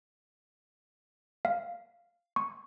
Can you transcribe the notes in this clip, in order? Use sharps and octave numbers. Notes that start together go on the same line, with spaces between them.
F5
C#6